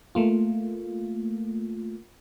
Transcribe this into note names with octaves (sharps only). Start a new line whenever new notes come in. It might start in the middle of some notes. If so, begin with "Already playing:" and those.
A3 A#3 F4